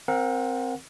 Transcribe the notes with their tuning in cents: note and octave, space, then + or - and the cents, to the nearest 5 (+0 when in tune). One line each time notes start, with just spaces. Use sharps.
C4 +0 A#4 +10 F#5 -35